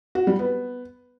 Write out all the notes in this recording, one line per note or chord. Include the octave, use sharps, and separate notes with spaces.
F#4
G3
B3